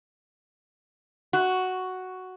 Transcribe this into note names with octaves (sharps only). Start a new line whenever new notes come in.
F#4